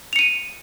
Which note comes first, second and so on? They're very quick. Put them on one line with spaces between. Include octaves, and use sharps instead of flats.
F7 C#7 D#7